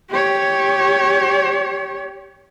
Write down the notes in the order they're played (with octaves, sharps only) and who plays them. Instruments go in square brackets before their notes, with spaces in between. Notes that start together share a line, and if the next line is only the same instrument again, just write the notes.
[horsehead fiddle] G4 C#5